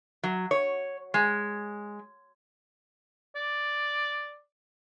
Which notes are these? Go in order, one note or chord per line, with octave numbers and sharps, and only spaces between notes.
F#3
C#5
G#3
D5